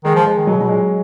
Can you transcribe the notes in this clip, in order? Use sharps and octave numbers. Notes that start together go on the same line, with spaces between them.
D#3 G#3
F3
G#3
D#3
B2 F#3
B2 F#3
A#2 G#3